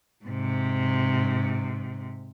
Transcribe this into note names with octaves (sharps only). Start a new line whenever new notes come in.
G#2 C3